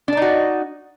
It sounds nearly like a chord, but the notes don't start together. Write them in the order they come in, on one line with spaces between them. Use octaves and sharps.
D4 D5 D#4 F#4